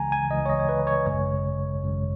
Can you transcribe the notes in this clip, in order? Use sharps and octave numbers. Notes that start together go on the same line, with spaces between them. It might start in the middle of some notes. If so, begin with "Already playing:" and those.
Already playing: C#2 C#3 E3 G#3 G#5 A#5
G#5
C#2 C#3 E3 G#3 D#5
C#5
D#5
C#5
B4
C#5
G#1 F#2 C#3 G#3 C#5
G#1 F#2 C#3 G#3